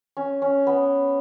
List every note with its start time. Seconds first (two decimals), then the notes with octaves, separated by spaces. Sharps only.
0.17 C#4
0.42 C#4
0.67 B3